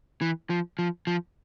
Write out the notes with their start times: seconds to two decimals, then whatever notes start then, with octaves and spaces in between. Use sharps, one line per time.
0.22 E3
0.50 F3
0.79 F3
1.07 F3